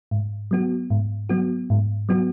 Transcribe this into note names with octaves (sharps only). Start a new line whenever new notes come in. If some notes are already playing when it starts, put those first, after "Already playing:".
G#2
F#3 B3 F#4
G#2
F#3 B3 F#4
G#2
F#3 B3 F#4